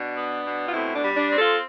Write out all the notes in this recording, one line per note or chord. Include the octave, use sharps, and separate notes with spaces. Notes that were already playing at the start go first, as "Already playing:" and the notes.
Already playing: B2 D4
B3
B2
F4
A2 C4 E4
D4
G3
D4
C4
F4 A4